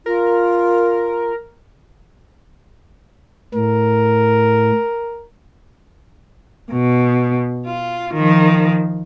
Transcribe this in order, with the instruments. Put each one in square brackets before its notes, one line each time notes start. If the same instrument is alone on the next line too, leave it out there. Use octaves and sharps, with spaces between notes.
[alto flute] F4 [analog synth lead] A#4
[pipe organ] A2 [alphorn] A#4
[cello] B2
F4
D#3 F3